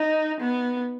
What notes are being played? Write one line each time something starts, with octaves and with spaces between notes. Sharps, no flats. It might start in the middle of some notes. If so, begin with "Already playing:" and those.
Already playing: D#4
B3